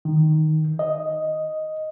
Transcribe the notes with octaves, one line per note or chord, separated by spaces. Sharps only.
D#3
D#5